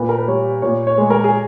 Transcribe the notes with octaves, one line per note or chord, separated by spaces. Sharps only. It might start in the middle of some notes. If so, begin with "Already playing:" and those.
Already playing: A#2 B4
A#4
B4
G3 C#5
A#2 C#5
C#5
G#3
A#4
G#4